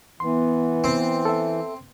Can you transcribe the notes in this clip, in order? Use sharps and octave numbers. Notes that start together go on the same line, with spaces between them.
E3 B3 C6
C4
A4 E5